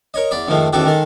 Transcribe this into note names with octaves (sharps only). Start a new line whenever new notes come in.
A#4 C#5 D#5
E2 D5 B5 D#6
F2 G#2 D#3 F3 A3
A1 E2 D#3 F#4 G4 A4
D#3 G#3 A4